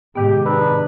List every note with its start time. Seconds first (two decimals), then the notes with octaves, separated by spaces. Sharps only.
0.15 G#2 C3 D#3 B3 G4
0.46 D4 D#4 B4 E6